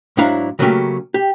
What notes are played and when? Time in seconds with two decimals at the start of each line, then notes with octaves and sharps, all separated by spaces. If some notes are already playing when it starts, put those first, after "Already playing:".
0.17 G#2 F#3 D4 E4 F5 A#5
0.59 C#3 F#3 A3 A#3 C#4 G4
1.14 G4